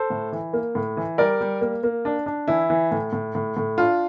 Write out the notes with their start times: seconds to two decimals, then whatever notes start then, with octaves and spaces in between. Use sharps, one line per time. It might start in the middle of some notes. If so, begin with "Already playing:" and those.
Already playing: A4 C5
0.10 A2
0.32 E3
0.53 A#3
0.75 A2
0.97 E3
1.18 G3 A#4 D5
1.41 G3
1.61 A#3
1.83 A#3
2.05 D4
2.26 D4
2.48 E3 E4
2.70 E3
2.92 A2
3.13 A2
3.35 A2
3.57 A2
3.77 D4 F4